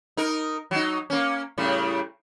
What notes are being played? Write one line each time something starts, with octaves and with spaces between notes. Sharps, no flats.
D#4 A#4
F#3 D#4
A#3 C#4
A2 C#3 G3